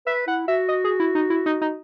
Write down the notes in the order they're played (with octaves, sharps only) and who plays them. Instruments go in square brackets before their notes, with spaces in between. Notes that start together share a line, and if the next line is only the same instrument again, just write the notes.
[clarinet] B4 [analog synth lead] E5
[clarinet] E4 [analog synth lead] F#5
[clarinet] F#4 [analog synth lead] E5
[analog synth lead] D#5
G#4
E4
D#4
E4
D#4
D#4